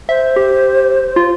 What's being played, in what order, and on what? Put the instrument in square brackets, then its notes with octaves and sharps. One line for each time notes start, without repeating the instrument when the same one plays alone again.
[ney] C5 [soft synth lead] E5
[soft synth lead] G4
F4